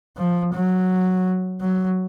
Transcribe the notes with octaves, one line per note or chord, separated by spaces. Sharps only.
F3
F#3
F#3